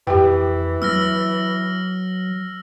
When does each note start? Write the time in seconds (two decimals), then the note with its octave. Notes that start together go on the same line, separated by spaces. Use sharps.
0.07 F2 E3 G4 B4 G5
0.82 F#3 E6 F6 A#6